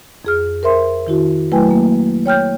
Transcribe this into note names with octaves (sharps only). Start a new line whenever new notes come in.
F2 G#4 F6
A#4 C5 E5 C6
D#3 E4 F#4
F#3 A3 E4 B4 G5 G#5
A#3
C#5 G5 F6 G6